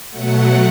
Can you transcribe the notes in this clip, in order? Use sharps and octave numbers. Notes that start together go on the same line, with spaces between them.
B2 F#3 A3 F#5